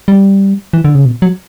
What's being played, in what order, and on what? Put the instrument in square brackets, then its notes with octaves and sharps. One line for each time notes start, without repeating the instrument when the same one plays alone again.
[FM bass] G3
E3
D3
C#3
B2
F#3